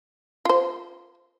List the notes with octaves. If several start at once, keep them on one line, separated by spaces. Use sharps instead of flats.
F4 C5